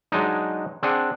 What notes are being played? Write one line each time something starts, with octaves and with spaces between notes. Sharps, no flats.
F#3 G#3 D4 D#4
C4 D4 G#4 F#5